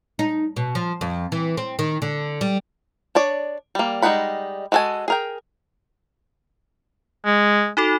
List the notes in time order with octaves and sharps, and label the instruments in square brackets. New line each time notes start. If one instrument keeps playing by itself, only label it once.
[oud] D#4
B2
F3
F2
E3
C4
D#3
D3
G3
[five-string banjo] D4 C#5 D5
G3 A#3
G3 G#3 D#4 F#5 B5
G#3 F#4 A4 B4 G#5
G#4 A#4 G5
[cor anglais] G#3
[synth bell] D#4 F#4 A4